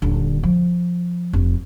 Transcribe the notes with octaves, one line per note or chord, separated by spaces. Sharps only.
D#1 D3
F3
F1